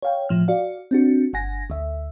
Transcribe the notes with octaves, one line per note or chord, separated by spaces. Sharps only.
C#5 F5 G5
A2 F3 F6
F#4 D5 F5
C4 D4 F#4
G1 F#5 G#5 A#6
D2 E5